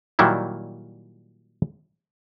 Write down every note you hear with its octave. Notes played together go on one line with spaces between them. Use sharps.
A#2 D#3 F#3 G3 E4